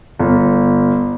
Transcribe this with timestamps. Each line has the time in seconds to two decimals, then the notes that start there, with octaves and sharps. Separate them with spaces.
0.19 G1